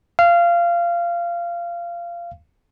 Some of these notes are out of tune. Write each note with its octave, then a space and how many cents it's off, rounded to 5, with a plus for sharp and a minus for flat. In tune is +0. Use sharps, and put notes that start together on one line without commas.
F5 -20